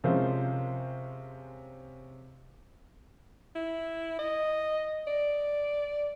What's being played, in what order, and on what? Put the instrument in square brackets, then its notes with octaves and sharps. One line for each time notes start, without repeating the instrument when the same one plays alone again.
[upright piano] C3 F3 G#3 C#4 A#4 C5
[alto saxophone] E4
D#5
D5